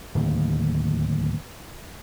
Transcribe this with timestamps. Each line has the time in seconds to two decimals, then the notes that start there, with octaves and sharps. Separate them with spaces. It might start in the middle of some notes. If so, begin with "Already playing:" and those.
0.15 D1 D#2